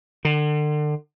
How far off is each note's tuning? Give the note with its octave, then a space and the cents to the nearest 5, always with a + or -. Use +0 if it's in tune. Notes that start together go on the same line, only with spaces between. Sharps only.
D3 +35